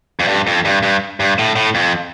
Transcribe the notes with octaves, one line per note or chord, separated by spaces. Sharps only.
F2
G2
F2
G2
G2
G2
A2
A2
F2